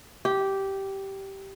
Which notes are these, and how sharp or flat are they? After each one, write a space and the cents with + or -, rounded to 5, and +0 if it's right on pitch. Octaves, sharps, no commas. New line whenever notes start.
G4 -10